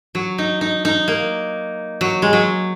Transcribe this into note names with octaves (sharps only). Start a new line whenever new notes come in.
F#3
D#4
D#4
D#4
A#3
F#3
G#3
F#3